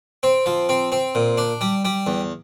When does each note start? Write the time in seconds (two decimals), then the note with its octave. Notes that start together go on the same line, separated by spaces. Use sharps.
0.23 C4
0.46 F3
0.69 C4
0.92 C4
1.15 A#2
1.38 D4
1.61 G3
1.85 G3
2.07 E2